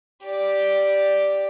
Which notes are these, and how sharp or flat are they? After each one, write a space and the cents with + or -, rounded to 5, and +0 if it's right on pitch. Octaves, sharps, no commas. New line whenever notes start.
G4 +0 D5 +0